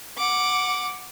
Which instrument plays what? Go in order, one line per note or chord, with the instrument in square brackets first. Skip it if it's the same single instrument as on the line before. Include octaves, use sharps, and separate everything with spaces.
[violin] F#5 D6